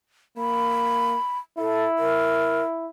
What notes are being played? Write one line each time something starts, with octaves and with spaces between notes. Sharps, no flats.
A#3 B5
E4 A4
A#4